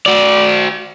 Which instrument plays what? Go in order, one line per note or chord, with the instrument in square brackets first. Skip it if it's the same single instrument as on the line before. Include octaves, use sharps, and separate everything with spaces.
[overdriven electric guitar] F#4 D5